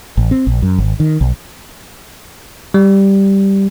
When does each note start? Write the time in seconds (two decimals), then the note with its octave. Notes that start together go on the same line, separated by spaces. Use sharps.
0.17 A1
0.31 C4
0.47 A#1
0.62 F#2
0.78 G#1
1.00 D#3
1.21 B1
2.74 G3